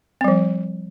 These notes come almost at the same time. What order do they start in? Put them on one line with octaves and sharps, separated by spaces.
C4 G3 F3